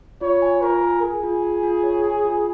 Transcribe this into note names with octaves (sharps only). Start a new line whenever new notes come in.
F4 C#5
G#5
F4 A#4
G#5
G#4 G#5
F4
G#5
F4
C#5
G#5
F4